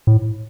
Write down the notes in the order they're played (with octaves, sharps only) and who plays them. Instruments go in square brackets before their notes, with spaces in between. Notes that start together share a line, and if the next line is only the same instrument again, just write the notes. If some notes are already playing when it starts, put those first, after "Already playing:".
[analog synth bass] A2